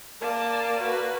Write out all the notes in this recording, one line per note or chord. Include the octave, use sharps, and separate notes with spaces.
A#3 D5 A5
F#4 B4